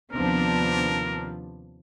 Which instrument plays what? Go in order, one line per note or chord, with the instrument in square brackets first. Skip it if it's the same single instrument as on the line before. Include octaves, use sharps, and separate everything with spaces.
[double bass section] D#2 C3 F3 [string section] B3 C4 D4 [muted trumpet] A#4